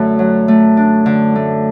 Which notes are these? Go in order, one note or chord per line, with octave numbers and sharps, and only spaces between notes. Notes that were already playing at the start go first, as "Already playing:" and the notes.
Already playing: F#2 D3 A3
F#3
A3
D4
D3
A3